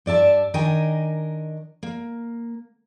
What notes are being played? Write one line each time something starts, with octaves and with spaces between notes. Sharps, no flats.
G2 D5 E5 A5
D#3 D4 A#4 D#5 G5 G#5
A#3